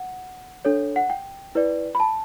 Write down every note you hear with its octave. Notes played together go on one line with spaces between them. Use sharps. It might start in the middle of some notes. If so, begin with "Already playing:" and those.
Already playing: F#5
D4 A4 C#5
F#5
G5
E4 B4 D5
B5
A5